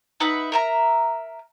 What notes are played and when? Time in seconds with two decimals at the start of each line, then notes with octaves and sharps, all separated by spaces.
0.20 D#4 B4 E5 F#5
0.52 A#4 E5 A#5